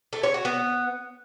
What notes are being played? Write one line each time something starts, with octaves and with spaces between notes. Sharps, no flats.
A3
C#5
F#4
B3